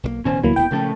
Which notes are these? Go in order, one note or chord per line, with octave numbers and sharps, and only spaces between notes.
B1 G3 A#3
D1 B2 E3 C#4 C5 G#5
D2 F#3 A#3 E4
D#1 B3 G5
A#2 C#3 F3 A3 C#4 A4